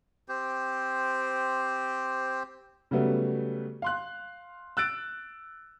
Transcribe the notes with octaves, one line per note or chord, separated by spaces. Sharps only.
C4 G4 C5
C#3 F#3 G3 A3 B3
F5 C6 F#6
E6 F#6 A6 D7